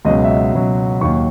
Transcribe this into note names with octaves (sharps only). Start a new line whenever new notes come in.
C#2 B2 F#3 D#5
E5
D#5
C#2 B2 F#3
D#2 D#3 F#3 C#6